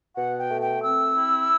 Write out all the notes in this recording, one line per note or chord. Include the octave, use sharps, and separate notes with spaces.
B2 F#5
G5
A3
G5
C4 E6
E4